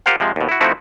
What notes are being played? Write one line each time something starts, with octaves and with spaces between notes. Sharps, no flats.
F4 G4 A#4 C5 F5 F#5
C3 F3 G#3
D#2 B2
E4 F#4
F3 A3 C4 D#4 E4 F#4